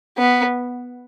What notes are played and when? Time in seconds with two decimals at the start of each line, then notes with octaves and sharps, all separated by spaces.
0.18 B3